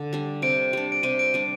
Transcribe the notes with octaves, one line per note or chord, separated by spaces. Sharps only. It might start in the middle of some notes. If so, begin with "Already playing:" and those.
Already playing: D3
G3 D4
C3 D7
G3 D4
D7
C3 D#7
D7
G3 D4 D#7